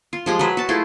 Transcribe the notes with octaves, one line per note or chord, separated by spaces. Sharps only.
F4
F3 G#3 G4
F#3 B4
F#4 A5
A3 E4 F4 G#4